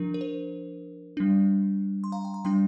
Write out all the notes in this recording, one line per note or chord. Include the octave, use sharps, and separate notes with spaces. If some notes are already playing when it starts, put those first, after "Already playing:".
Already playing: F3 D4 A#4
A#4
C5
G3 D4
C6
F5 A#5
G5
A#5
G3 D4 G5 C6